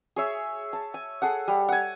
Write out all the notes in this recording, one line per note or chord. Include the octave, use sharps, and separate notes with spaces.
G#4 C#5 E5
A5
G#5
G#4 A4 F#5
G3
F#5 G#5